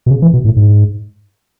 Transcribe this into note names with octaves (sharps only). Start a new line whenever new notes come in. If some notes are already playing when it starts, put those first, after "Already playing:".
B2
C#3
E3
B2
A2
G#2